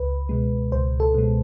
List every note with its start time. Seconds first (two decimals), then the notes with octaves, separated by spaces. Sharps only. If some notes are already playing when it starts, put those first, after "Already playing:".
Already playing: C#2 B4
0.29 B2 G#3
0.72 C#2 C5
1.00 A4
1.14 B2 G#3